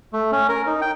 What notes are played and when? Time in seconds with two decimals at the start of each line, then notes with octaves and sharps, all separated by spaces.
0.13 A3
0.32 C#4
0.49 A#4
0.66 D#4
0.81 G5